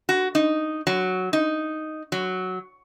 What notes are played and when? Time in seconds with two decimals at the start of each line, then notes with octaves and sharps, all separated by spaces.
0.09 F#4
0.35 D#4
0.87 F#3
1.33 D#4
2.12 F#3